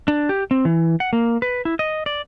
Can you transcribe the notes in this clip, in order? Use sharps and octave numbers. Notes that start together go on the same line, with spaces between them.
D4
G4
C4
E3
F#5
A#3
B4
E4
D#5
D5